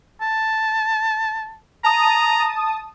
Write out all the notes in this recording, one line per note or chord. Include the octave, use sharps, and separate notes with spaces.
A5
A5 A#5 D#6